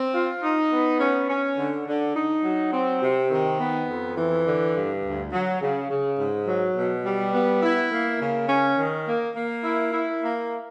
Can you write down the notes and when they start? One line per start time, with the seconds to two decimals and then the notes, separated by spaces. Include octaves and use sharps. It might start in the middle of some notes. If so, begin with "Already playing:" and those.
Already playing: C4
0.14 F4
0.43 D#4
0.72 B3
1.00 C#4
1.30 C#4
1.58 D3
1.87 D3
2.16 D#4
2.44 F#3
2.73 C4
3.02 C3
3.31 D#3
3.60 B3
3.89 F2
4.17 E3
4.46 D3
4.75 G2
5.04 D2
5.32 F#3
5.61 C#3
5.90 C#3
6.19 G#2
6.47 F#3
6.76 B2
7.05 G3
7.34 B3
7.63 E4
7.92 A#3
8.20 C#3
8.49 C#4
8.78 D#3
9.07 A#3
9.35 A#3
9.64 E4
9.93 E4
10.22 A#3